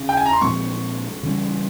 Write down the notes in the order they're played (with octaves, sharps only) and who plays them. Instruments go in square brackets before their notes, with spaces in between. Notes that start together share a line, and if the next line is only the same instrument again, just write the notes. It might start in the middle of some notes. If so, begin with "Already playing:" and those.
Already playing: [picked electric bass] C#3 C#4
[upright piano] G5
G#5
A#5
C6
[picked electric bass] A#2 F3 G#3 C4 [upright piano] C#6
[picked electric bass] C#3 E3 G3 C#4